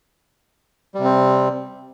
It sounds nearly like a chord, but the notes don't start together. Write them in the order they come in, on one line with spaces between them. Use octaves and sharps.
G3 C3 C4